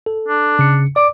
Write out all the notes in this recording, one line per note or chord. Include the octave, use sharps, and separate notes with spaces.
A4
D4
C#3 C#7
D5 D6